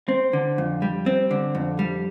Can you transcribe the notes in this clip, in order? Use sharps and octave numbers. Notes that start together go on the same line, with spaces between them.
C4
D3
F2
G3
C4
D3
F2
G3